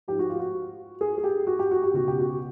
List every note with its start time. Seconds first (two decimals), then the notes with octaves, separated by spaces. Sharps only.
0.08 G#2 F3 G4
0.19 F#4
0.30 F4
0.39 F#4
1.01 G#4
1.18 G#4
1.24 G4
1.47 F#4
1.59 G4
1.71 F#4
1.83 G4
1.93 C#2 B2 F#4
2.08 G4
2.20 F#4